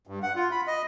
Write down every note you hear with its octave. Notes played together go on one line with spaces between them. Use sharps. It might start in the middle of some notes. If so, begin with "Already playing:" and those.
G2
F#5
F4
B5
D#5